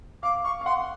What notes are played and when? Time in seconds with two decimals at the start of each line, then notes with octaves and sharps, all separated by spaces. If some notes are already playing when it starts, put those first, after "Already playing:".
0.23 F5 D6
0.44 F5 C#6
0.61 F5
0.66 F#5 C6